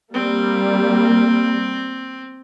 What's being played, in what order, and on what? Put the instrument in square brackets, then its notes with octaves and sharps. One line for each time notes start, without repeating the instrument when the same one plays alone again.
[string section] G3 A#3 [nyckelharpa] C4